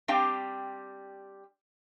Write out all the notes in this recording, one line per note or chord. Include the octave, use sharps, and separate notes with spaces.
G3 C4 D4 G4 F5 G5